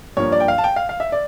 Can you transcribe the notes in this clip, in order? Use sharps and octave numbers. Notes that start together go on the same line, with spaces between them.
G2 F3 A#3 C#5
D5
G5
F5
A5
G5
F5
F5
E5
D5